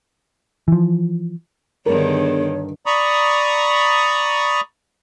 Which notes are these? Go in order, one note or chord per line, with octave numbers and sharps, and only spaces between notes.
E3 F3
G2 D3 D#3 B3 D4 G#4 A#4 C#5
D5 A#5 B5 C#6 D#6